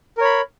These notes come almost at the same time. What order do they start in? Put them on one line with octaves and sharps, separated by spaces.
A#4 C#5 B5